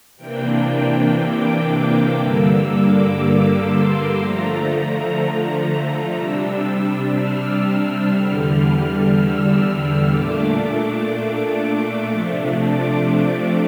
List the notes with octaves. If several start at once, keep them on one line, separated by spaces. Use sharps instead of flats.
C3 E3 A#3 D4 G5
D6
G2 D3 G3 A#3 E6
D6
C6
D3 F3 A3 A#5
A#5
C3 G3 D4 E6
F6
E2 D3 G3 F6
E6
A#2 A3 D4 D6
C3 F3 A3 D4
D6